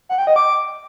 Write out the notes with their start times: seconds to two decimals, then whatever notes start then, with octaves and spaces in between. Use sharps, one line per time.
0.09 F#5
0.18 G5
0.27 D#5
0.36 D6